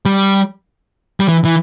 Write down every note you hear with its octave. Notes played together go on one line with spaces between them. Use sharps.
G3
G3
E3
E3